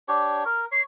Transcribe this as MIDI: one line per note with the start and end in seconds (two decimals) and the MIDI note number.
0.08 0.44 62
0.08 0.44 67
0.08 0.44 73
0.46 0.66 70
0.46 0.65 89
0.72 0.83 73
0.72 0.81 96